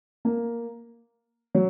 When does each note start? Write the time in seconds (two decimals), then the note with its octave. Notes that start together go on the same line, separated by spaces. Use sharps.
0.25 A#3
1.55 F#3